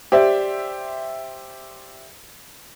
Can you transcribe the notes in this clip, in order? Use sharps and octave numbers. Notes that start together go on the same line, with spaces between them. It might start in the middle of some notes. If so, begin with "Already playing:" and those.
G4 C5 D5 E5